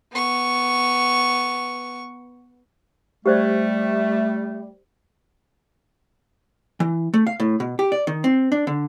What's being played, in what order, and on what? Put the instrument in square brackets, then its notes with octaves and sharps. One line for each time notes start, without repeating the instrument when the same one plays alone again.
[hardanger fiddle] B3 C#6
[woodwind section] G3 A3 [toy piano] G4 C5 D5
[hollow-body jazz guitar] E3
A3
F5
A2
B2
G4
D5
D#3
C4
D4
D3